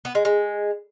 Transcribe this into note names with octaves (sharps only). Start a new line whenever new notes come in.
B3
G#3
G#3